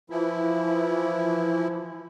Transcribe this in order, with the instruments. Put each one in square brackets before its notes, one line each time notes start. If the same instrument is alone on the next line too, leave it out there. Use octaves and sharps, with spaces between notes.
[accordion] E3 F3 E4